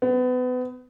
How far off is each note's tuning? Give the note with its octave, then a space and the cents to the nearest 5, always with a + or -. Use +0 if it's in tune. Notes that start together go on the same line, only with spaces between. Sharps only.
B3 +30